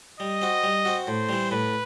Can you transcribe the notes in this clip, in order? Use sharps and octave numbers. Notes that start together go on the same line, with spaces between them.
G3 D#5
C4 F#4
G3
C4 F#4
A2 C5
E3 G3
A2 B4